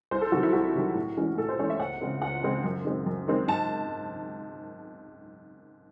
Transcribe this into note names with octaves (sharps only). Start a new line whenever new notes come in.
C2 C5
A4
C3 D#3 F#3 F#4
E4
C2 F#4
C3 D#3 F#3
A2
E3 G#3 C#4
A2 A4
C5
E3 G#3 C#4 C#5
E5
C#2 F#5
C#3 G#3 C4
C#2 F#5
C#3 G#3 C4
F#2
D#3 G#3 C4
F#2
D#3 G#3 C4
G#2 A5